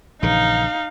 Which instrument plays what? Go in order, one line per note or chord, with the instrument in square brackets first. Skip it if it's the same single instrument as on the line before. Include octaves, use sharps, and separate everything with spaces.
[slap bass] A#1 C#3 E3 [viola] D#4 F5